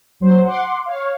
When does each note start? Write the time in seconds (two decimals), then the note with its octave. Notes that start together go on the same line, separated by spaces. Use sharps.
0.20 A#1 F#3 C5
0.45 F#5 C6 D6
0.86 C#5 F5